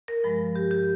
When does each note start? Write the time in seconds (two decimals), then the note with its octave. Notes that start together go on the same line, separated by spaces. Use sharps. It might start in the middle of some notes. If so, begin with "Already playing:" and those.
0.08 A#4
0.24 G2 F3 G#3
0.56 G4
0.71 G4